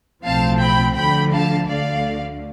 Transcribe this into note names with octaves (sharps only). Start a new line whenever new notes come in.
B1 A2 F3 C4 F5 A5
G5 B5
D2 D3 F3 G5 B5
F5 A5
D2 D3 A3 D5 F5